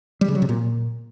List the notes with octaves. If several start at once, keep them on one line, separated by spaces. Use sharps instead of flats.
G3
C#3
F#3
C3
A#2